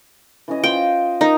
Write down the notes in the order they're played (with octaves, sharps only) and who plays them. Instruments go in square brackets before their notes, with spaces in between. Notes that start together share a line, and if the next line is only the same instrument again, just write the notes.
[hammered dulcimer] E3 C#4 D#5
[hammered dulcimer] F4 C5 [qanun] G5
[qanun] D#4 [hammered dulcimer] A#4